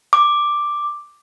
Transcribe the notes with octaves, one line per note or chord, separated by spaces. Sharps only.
D6